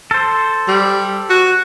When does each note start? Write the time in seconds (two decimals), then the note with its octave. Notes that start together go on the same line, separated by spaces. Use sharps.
0.11 A4 C5
0.68 G3
1.29 F#4